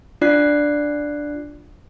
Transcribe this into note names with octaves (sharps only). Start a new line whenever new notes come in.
D4 F4 D5 F#6 C7